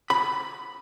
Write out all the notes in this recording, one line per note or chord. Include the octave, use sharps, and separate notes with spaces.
B5